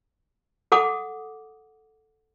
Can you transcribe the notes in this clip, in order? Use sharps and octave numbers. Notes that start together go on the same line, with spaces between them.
A4 F#5 D6 D#6